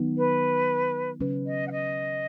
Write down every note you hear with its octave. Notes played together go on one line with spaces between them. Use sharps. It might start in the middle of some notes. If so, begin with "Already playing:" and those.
Already playing: D#3 F#3 B3 D#4
B4
C#3 F#3 C#4 B4
D#5
F#5
D#5